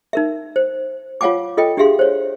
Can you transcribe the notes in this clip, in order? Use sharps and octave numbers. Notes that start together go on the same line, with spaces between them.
D#4 A#4 E5
C5
F4 C#5 F5 F#5 G#5 D6
F4 A4 D#5 G5
D4 G4 G#4 E5 F5 C6
C5 C#5